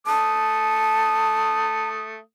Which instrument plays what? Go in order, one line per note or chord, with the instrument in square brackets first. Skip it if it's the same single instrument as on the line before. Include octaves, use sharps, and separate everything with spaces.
[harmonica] A3 D#6 [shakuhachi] A5